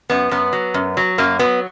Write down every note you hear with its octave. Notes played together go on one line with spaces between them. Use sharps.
F#2 B3
F#2 B3
F#3
F#2
F#3
F#2 A#3
F#3 B3